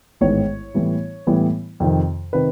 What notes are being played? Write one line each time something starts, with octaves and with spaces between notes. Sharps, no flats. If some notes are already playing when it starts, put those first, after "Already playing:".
A1 G#2 D#3 G#3 B3 C#5
A2 E3 G3 B3 E4
A2 E3 G3 B3 E4
F2 C3 D#3
C3 D#3 B4